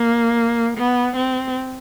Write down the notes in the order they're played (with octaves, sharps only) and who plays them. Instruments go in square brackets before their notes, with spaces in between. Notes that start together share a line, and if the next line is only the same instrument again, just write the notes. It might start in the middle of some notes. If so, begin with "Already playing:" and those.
Already playing: [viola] A#3
B3
C4